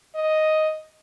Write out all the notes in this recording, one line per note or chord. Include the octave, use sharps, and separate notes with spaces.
D#5